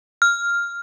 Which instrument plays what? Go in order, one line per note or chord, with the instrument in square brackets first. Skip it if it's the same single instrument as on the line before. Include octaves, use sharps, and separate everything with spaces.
[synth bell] F6